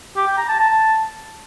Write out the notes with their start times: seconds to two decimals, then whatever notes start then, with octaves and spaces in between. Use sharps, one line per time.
0.16 G4
0.27 G5
0.38 A#5
0.49 A5
0.59 A5